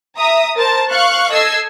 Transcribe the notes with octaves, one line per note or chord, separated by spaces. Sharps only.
E5 A#5 D#6
A#4 C5 A5 A6
F5 C#6 F#6
A4 D#5 E6 G#6 C7